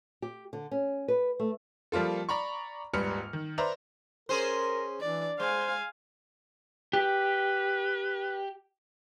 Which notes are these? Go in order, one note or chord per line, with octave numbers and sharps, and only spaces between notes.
G4
D3
C#4
B4
A3
F3 G3 A#3 F4 A4
D5 A#5 B5 C#6
D#1 G#2 G3 B4 F6 C#7
D#3
B4 C5 D5 E5 A#5
C#4 G#4 A#4 C5
E3 D4 D5
G#3 C5 F5 G#5
G4 B4